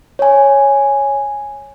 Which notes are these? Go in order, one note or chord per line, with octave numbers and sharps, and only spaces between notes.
C#5 G#5